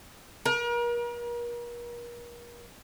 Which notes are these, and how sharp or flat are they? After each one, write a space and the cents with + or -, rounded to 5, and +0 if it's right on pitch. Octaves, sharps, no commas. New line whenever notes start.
A#4 +40